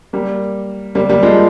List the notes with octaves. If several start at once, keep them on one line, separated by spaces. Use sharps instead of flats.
G3 A#3
G3 A#3
G3 A#3
F3 G#3